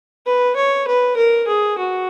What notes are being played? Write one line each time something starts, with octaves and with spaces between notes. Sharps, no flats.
B4
C#5
B4
A#4
G#4
F#4